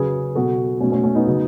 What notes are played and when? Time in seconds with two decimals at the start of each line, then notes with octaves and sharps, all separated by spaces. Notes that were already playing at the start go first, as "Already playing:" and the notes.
Already playing: C#3 F#3 G#4 B4
0.35 B2 F#3 F#4 A4
0.81 B2 F#3 A3 C#4
0.92 A3 C#4
1.03 A3 C#4
1.15 B3 D#4
1.27 C#3 F#3